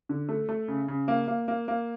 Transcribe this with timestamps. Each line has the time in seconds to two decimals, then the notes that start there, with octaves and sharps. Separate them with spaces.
0.09 D3
0.29 A3
0.49 A3
0.68 C#3
0.88 C#3
1.08 A#3
1.28 A#3
1.48 A#3
1.68 A#3